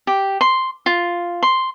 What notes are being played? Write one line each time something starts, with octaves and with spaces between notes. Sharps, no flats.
G4
C6
F4
C6